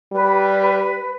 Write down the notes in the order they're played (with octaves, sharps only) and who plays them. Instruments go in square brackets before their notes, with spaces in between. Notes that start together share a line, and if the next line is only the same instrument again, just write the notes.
[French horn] G3 [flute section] B4